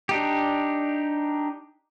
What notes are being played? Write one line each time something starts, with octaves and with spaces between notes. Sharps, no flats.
D4 D#4 G4